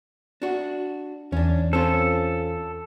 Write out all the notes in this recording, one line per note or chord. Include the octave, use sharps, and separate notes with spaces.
D4 F#4
E2 C#4 D4
C4 C#4 F4 A4